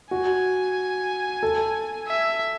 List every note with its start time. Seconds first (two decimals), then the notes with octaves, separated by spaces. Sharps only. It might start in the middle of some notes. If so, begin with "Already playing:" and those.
0.11 F#4 G#5
1.43 A4
2.08 E5